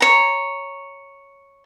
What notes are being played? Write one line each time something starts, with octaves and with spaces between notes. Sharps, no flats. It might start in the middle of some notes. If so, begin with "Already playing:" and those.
C#5 A#5